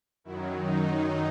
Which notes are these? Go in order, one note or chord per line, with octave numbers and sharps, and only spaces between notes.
F#2 D#3 F#3 E4
D#4